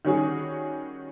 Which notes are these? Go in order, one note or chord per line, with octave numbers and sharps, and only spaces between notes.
D#3 G3 C#4 F#4 G#4